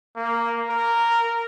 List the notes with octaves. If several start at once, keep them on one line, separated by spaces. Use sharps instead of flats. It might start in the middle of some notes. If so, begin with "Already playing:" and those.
A#3
A#4